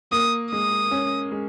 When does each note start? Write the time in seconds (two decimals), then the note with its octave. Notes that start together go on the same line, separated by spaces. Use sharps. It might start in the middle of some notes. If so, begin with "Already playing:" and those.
0.12 A#3 D#6
0.52 G#3 D#6
0.91 C#4
1.32 G#3